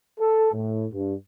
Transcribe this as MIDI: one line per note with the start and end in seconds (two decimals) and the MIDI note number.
0.19 0.49 69
0.53 0.85 45
0.93 1.13 43